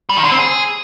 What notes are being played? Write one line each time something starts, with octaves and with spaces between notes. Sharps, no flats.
G3
D#3
D3
C4
G#4